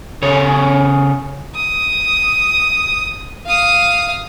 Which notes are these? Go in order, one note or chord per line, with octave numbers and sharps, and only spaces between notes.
C#3 A4 C#5
D#6
F5 D#6